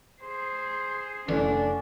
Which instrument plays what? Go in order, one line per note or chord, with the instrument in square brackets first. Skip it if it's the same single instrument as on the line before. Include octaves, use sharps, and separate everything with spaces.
[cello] G#4 C5
[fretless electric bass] F1 E3 [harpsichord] D3 [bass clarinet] C#4 [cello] D4